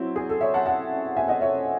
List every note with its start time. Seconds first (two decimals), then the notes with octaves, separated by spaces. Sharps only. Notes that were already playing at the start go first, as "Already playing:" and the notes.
Already playing: F#3 C4 E4
0.16 G#4
0.29 A4
0.41 C#5 E5
0.54 F#5 A5
0.66 F#5 A5
1.17 E5 G#5
1.28 D#5 F#5
1.41 C#5 E5